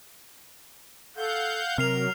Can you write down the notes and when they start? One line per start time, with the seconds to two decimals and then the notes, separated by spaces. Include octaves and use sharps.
1.16 A4 F5 F#5 G6
1.78 C3 F#3 C4 A#4 F6 C7 F7